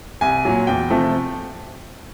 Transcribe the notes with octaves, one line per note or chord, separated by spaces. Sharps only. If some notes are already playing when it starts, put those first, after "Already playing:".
C2 G#5
A#2 F#3
E2 G5
C3 F3 A3